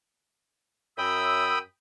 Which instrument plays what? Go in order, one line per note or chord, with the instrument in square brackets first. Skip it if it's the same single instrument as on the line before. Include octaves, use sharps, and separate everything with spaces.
[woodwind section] F#2 E6 [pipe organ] G5 B5 D#6